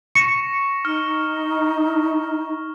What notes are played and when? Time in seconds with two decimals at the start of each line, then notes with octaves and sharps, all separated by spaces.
0.15 C#6 A#6 C#7 E7
0.85 D#4 F6